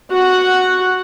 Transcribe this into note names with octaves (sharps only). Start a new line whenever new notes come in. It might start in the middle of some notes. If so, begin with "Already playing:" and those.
F#4 F#5